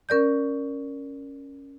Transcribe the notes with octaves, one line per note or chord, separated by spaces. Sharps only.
C#4 A#4 D5 G6